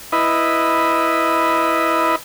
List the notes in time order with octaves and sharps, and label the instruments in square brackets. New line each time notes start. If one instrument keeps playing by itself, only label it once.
[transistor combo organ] E4 B4 D#5